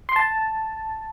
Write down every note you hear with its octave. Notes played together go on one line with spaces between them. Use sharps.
C6
A5